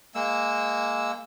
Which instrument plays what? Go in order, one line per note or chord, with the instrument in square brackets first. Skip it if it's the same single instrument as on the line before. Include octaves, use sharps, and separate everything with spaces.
[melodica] G#3 A#3 E6